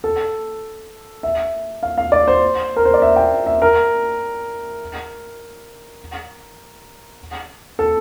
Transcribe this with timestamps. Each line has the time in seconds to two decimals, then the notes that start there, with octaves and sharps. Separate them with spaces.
0.04 A4
1.23 E5
1.83 F5
1.98 F5
2.12 D5
2.28 C5
2.76 A#4
2.85 C5
2.94 D5
3.02 E5
3.16 G5
3.46 E5
3.62 A#4
7.79 A4